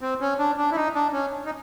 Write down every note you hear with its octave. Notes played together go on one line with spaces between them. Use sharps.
C4
C#4
D4
D4
E4
D#4
D4
C#4
D#4